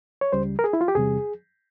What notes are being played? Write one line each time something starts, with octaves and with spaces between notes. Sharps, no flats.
C#5
C#2 C#3 G3 C5
A#4
G#4
E4
F4
G4
E2 C3 G3 G#4